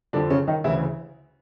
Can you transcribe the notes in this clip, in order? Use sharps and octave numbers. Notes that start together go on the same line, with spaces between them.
F2 D3 F3 D4
C#3 C#4
D#3 D#4
D2 C#3 E3 E4